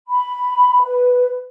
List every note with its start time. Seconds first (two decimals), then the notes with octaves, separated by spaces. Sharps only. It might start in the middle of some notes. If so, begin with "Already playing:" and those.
0.07 B5
0.83 B4